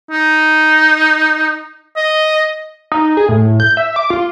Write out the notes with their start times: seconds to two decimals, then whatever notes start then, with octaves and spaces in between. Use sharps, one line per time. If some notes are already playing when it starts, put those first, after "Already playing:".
0.11 D#4
1.97 D#5
2.92 D#4
3.17 G#4
3.28 A2
3.60 G6
3.77 E5
3.96 D6
4.10 F4